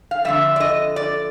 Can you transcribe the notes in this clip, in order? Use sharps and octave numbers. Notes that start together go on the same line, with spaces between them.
F5
F2 D3 G3 E5
D5
D#5
D5